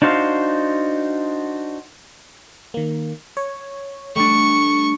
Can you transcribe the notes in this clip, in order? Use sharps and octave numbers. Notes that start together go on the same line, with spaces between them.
D4 D#4 F#4 C5 F5
D#3 A#3
C#5
G3 A3 D4 C#6